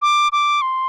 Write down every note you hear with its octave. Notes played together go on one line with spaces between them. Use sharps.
D6
D6
C6